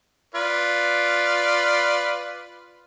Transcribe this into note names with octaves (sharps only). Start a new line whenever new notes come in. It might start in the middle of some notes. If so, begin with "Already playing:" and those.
F4 B4 D5